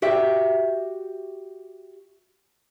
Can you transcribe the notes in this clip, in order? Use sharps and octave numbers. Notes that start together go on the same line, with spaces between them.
F#4 G4 E5